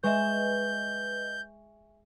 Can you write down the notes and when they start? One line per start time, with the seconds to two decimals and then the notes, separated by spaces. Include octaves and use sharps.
0.04 G#3 B4 D#5 E5 G#5 C#6 G6 E7